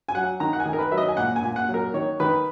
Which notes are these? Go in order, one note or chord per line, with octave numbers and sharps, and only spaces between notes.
G#5
F#3 F#5
D#3 A#5
F#5
G#5
D#3
A#4
B4
F#3 E5
D#5
G#5
A#2 F#5
G#5
A#2
F#5
F#3
A#4
D#3 C#5
D#3 B4